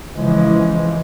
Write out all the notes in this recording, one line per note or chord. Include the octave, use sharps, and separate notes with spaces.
C#3 E3 F3 G#3